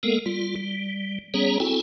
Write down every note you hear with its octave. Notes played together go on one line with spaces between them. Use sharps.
G#3 A#3 B3 A4 A#4
G3 F4
G3
G3 B3 C#4 G#4 C#5 A#5
C4 E4 F#4 A4 G5 G#5